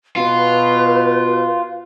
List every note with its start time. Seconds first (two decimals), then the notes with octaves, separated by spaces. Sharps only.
0.16 B2 F4 B4